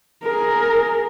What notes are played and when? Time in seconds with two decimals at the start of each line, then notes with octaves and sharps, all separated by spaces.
0.24 G#4 A#4